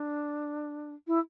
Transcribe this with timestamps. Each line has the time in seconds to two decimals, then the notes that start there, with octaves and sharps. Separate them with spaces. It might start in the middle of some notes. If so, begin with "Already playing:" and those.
Already playing: D4
1.07 E4